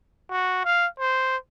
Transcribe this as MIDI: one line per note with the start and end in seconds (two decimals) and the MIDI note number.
0.31 0.62 66
0.65 0.87 77
1.00 1.37 72